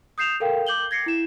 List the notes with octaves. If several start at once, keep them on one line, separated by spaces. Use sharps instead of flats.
D#6 G6 C7 E7 F7
A4 A#4 F5 G5
D6 G6 F#7 G7
G#6 A#6 C7 C#7
E4 E7